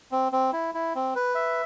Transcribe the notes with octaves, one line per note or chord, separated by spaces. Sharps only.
C4
C4
E4
E4
C4
B4
E5